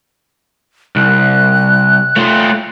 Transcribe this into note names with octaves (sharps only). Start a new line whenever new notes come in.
C2 F#6
A3 F4